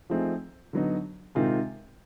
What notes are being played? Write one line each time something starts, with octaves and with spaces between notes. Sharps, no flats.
F3 A3 C4 D#4 G#4
D3 F#3 B3 D#4
C3 D#3 G#3 C4 F4